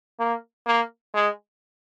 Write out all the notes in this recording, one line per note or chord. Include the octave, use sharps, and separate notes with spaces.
A#3
A#3
G#3